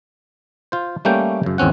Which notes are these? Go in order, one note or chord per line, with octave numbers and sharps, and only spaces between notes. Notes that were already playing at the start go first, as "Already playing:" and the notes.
F4 C5
G3 A3 A#3 C#4 G5
F#2 C#3
G#1 E2 C4 C#4 F#5